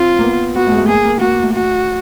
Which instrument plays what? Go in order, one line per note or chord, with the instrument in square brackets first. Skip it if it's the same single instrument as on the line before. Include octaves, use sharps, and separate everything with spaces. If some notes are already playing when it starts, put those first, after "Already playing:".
Already playing: [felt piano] C4 [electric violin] F4
[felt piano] A#3
B3
[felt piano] B3 [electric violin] F#4
[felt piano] A3
G#3
A3
[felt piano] A#3 [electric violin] G#4
[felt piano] A#3
[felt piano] A#3 [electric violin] F#4
[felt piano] A#3
A3
[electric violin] F#4